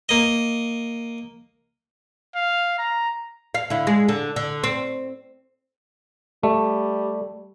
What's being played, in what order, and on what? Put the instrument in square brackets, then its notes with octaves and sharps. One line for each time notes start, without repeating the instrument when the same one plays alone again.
[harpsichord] A#3 D#5
[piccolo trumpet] F5
A#5
[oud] F5
D3 E4
G#3
D3
D3
C4
[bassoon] G3 [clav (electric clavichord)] A3